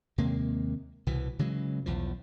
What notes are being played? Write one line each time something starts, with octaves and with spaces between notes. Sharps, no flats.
D#2 C3 G#3 A#3
C2 B2 E3
C#3 E3 F#3 G#3
B1 E2 F3